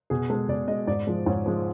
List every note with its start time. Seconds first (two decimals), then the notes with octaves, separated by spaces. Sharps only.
0.10 B2 G#4
0.30 G#3 A4
0.49 B2 D5
0.68 G#3 D#5
0.87 G#2 D5
1.07 F3 G#3
1.26 G#2 C#5
1.46 F3 G#3